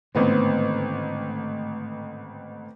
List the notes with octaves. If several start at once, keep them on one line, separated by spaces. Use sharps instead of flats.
A1 G#2 D3 D#3 B3 C4